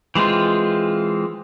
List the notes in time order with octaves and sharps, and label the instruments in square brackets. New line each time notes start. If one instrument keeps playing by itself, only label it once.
[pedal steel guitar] E3 G#3 C4 F4